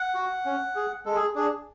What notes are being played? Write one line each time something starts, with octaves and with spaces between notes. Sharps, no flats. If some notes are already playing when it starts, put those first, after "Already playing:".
Already playing: F#5
F#4
C#4
G#4
G#3 A4
G#4
D4 G#4